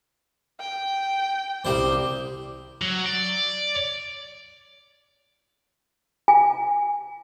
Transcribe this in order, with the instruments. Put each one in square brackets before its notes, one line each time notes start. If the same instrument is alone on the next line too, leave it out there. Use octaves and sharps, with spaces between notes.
[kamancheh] G5
[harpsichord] C2 G3 C5 [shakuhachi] D6
[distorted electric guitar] F#3
D5
[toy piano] G#5